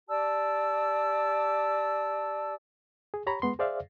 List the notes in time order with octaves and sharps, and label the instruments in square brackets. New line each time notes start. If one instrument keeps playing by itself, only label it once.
[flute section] G4 D5 A5 E6
[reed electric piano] G#4
G4 C#5 A#5 B5
G#3 B3 C6
G#4 C5 D5 E5 F5